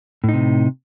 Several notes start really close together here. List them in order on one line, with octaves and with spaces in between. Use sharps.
A2 D#4 C3